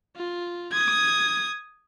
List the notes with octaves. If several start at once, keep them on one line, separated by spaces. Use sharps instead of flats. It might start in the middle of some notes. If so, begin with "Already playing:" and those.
F4
D#6 G#6